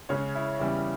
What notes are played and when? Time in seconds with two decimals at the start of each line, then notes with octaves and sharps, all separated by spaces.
0.09 C#3 G#3 C#4 C#5
0.35 E4
0.59 E2 C#3 E3 G3 C#4 E4